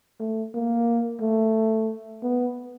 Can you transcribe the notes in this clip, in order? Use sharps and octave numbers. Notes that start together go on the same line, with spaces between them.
A3
A#3
A3
B3